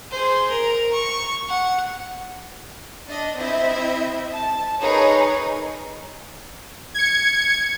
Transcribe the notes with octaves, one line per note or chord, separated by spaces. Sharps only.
G#4 C5
A#4
C#6
F#5
D4 D#5
C4 E4 D#5 E5
A5
D#4 G#4 A#4 B4 C#5
G#6 C#7